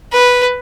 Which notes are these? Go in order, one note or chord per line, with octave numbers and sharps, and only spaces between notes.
B4